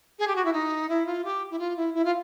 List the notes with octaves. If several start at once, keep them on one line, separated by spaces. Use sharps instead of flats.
G#4
G4
F#4
E4
D#4
E4
F4
G4
E4
F4
E4
E4
F4